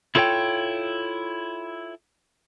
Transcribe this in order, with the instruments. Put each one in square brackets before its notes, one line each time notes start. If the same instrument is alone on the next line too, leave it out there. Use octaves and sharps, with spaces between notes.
[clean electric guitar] E4 F4 A4 C#5 D5 G5